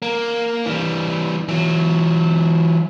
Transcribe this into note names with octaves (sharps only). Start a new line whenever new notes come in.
A#3
E3 G3
E3 F#3